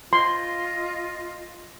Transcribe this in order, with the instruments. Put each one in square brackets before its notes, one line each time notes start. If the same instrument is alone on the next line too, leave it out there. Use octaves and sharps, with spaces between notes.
[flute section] F4 D#5 [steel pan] C6